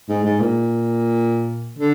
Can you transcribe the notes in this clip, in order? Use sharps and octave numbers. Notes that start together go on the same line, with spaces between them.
G#2
G#2
A#2
D3